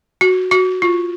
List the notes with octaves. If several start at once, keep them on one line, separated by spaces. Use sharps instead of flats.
F#4
F#4
F4